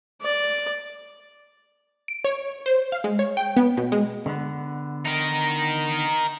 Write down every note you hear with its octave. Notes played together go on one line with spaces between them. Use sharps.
D5
D7
C#5
C5
F5
G#3
C#5
G5
B3
B2
G#3
D3 B3
D#4 A#4